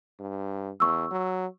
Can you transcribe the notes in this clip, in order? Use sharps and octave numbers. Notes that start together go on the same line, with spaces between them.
G2
E2 C#6 E6
F#3